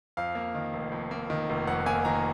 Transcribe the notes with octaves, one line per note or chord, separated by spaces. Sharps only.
F2 F5
A#3
D#3
F1
F2
A#3
D#3
F1
F2 F#5
A#3 G#5
D#3 A#5